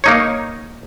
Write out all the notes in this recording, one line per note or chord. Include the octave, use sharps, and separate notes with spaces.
A#3 D#4 C#5